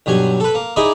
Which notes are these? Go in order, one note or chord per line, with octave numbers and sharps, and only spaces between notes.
B1 G2 F#3 G#5
A4 B4
A#3
D#4 E4 G#4 D5 D#5